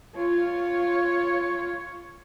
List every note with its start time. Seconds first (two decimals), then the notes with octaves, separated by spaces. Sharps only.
0.16 F4 C#5